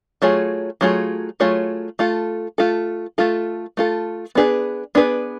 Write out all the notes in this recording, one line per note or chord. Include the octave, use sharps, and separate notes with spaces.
F#3 A3 F4 G#4 C#5
F#3 A3 F4 G#4 C#5
F#3 A3 F4 G#4 C#5
A3 F4 A4
A3 F4 A4
A3 F4 A4
A3 F4 A4
B3 D4 G#4 B4
B3 D4 G#4 B4